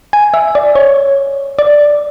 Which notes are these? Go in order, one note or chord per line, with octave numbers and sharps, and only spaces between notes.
G#5
E5
D5
C#5
D5